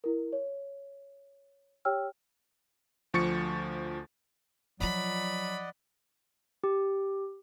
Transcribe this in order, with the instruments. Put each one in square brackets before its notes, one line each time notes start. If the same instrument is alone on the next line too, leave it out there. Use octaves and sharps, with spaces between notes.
[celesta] E4 A#4
C#5
G4 C#5 G5 E6 F6
[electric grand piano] D2 F3 C#6 A6 C#7
[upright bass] F3 F4 [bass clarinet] F#3 [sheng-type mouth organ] D5 D#5 F#5 [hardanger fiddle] B5
[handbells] G4